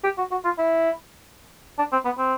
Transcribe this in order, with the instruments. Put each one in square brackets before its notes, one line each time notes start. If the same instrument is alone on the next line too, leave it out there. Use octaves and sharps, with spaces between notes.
[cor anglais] G4
F#4
F#4
F4
E4
D4
C4
B3
C4